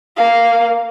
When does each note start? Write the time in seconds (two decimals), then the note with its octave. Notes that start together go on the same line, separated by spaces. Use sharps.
0.17 A#3 F5